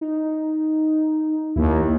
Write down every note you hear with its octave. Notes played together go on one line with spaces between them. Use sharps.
D#4
D#2 E4